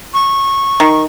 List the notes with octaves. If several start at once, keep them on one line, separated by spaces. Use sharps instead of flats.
C#6
D#3